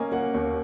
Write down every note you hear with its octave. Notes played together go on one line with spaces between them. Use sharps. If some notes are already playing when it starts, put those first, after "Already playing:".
Already playing: A#3 C#4 D#5 G#5
A#3 F#5
D#2